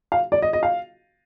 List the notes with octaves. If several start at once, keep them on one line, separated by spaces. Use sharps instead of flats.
F5
D5
D#5
D#5
F5